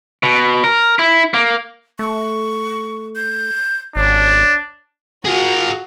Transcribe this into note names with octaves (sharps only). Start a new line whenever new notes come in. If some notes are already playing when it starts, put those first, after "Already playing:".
B2
A#4
E4
A#3
A3 C#6
G6
G#1 D4 C#5
F4 F#4 G#4 A#4 F5